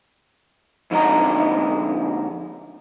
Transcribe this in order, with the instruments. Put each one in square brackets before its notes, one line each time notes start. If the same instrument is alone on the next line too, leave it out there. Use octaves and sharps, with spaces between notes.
[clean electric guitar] F2 D3 G#3 D#4 A#5